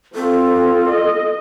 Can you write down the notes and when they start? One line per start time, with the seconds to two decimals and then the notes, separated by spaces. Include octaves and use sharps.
0.15 C4 F4 A4
0.88 D#5